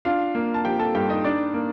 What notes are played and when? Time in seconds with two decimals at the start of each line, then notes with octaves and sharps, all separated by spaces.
0.05 D4 F4 F5
0.35 A#3
0.54 A5
0.65 F3 G4 G5
0.79 A4 A5
0.94 G2 G4 G5
1.09 D#4 D#5
1.24 D4 D#4 D5
1.54 A#3